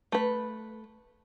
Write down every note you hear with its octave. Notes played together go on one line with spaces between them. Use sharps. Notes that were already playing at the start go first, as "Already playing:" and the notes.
A3 B4